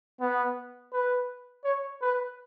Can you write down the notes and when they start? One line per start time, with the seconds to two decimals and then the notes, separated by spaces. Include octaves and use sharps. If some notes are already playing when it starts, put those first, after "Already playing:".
0.21 B3
0.93 B4
1.64 C#5
2.01 B4